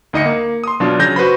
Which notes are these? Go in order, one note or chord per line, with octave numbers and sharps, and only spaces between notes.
D2 D#4 D#5 D#6 C#7
A#3
C6 D#6
B2 F#3 D4 F4
C#3 F#3 G6 A#6
F#4 B4 C5 B5